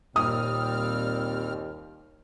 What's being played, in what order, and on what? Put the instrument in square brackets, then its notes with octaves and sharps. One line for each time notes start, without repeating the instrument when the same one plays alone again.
[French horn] D#2 [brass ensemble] A#2 [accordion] G3 C4 F6 [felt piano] D#6